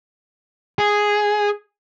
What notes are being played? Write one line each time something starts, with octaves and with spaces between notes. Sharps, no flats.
G#4